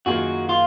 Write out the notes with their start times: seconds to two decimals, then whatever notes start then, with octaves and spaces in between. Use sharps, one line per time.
0.06 F#2 D#3 A#3 F4 F#4 G#4
0.49 F4